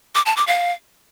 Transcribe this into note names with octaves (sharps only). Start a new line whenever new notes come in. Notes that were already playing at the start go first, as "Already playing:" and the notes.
D6
A5
D6
F5